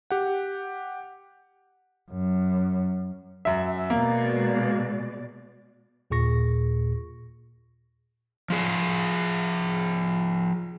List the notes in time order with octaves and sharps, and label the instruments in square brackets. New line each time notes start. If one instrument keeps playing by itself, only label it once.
[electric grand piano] G4 F#5
[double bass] F#2
[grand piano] F#2 E5
[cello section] B2 G#3 D5 [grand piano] A#3
[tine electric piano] D#2 A#2 G#4 C#6 A#6
[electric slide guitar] F3 G#4